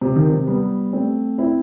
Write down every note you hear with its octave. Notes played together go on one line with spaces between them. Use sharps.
C3
D#3
C3
G3 B3
A3 C4
C4 E4